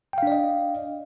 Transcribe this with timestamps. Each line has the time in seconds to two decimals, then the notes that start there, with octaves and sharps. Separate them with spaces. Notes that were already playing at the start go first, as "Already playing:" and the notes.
0.13 G5
0.18 F5
0.23 D4
0.27 D5
0.32 D#5